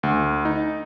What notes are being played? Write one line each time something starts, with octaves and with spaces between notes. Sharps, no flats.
D2
D#4